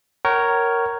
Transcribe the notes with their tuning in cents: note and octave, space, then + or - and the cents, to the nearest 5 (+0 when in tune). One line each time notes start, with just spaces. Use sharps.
A#4 +0 C#5 +0 F#5 +45